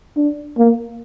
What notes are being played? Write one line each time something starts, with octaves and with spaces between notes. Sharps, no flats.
D4
A#3